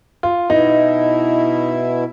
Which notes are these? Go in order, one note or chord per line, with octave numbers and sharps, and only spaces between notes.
F4
B2 D#4 E4